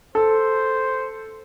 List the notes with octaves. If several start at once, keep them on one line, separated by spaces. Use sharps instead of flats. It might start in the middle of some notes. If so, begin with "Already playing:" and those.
A4 C5